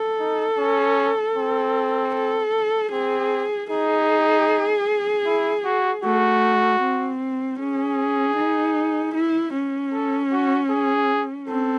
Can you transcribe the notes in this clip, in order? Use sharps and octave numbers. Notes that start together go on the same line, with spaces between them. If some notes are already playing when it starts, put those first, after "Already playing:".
Already playing: A4
D#4
C#4
C4
A4
C4 G#4
D#4 G#4
E4
F#4
A3 F#4
C4
C#4 G#4
D#4
E4
C#4
A4
F#4
G#4
C4 A4